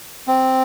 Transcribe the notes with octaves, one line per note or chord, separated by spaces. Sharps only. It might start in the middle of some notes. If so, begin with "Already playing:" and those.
C4